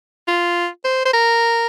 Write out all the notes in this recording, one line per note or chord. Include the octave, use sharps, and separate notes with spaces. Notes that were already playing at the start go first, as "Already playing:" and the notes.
F4
C5
C5
A#4